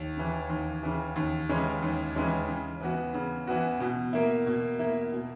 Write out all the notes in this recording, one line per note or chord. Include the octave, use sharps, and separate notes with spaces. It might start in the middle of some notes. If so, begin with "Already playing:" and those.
Already playing: D#2
C#3 E3
D#2
C#3 E3
D#2
C#3 E3 G#3 C#4
D#2
C#3 E3 G#3 C#4
C#3
E3 B3 F#4
C#3
E3 B3 F#4
B2
A#3 E4
B2
A#3 E4
B2